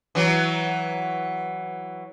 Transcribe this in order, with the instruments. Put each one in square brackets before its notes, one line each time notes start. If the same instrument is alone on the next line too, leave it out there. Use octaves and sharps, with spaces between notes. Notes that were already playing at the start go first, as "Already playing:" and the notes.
[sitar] E3 F#3